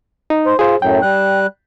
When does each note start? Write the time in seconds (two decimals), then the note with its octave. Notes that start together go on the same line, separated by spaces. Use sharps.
0.30 D#4
0.46 C5
0.59 F4 G#4 C5
0.82 F#2 A2 F#3 G5
1.02 G3 F#6